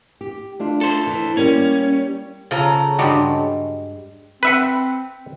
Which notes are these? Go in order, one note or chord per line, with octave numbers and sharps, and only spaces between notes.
G4
A3 D4 F4
A4 C5
E3
G3 A#3 C#4
C#3 F3 A4 A#5
G2 G3 G#3 F#4 G4
C4 B4 E5 F#5